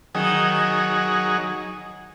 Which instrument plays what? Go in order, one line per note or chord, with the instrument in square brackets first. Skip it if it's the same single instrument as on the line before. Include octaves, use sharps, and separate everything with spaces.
[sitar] D#3 [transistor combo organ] F#3 D#4 G#4